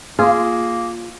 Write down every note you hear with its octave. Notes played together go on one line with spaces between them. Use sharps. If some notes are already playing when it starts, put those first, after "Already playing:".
A#3 F4 G#4